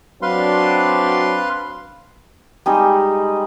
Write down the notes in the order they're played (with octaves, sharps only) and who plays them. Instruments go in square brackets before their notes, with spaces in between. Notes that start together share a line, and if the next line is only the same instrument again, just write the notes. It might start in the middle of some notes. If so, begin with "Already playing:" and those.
[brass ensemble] F#3 C4 D4 [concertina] B4 F5 C6
[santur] G3 G#3 D#4 G#4